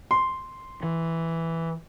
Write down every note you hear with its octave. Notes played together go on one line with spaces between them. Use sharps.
C6
E3